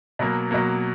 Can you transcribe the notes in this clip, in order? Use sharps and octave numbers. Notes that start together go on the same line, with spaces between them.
B2 F#3 A#3
B2 F#3 A#3